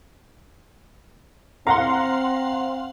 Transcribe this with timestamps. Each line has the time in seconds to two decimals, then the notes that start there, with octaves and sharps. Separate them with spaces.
1.67 C4 F5 F#5 A#5 C6